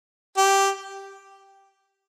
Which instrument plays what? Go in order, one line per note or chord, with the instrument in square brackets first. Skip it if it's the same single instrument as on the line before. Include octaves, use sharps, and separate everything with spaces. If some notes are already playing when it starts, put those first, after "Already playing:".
[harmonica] G4